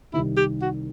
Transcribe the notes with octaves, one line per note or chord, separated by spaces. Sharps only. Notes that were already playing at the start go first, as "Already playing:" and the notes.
C2 C3 D#3 E4
G4
F#4